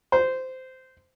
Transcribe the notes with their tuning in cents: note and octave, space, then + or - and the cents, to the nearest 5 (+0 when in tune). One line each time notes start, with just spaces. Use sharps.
C5 -15